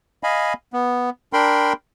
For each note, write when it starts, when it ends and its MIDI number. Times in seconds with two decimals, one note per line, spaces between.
0.23 0.53 75
0.23 0.53 77
0.23 0.53 80
0.23 0.53 83
0.73 1.10 59
1.33 1.73 62
1.33 1.73 70
1.33 1.73 79
1.33 1.73 83
1.33 1.73 84